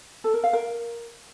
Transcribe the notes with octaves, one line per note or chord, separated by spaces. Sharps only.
A4
A#4
F5
A#4